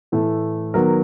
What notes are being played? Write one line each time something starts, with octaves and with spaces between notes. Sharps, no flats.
A2 E3 A3
D#3 F#3 B3 A#4